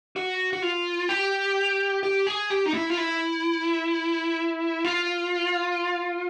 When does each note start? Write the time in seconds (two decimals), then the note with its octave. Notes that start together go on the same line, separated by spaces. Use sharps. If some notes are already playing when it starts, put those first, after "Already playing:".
0.16 F#4
0.53 F#4
0.62 F4
1.09 G4
2.03 G4
2.27 G#4
2.50 G4
2.66 D#4
2.74 E4
2.90 F4
2.97 E4
4.85 F4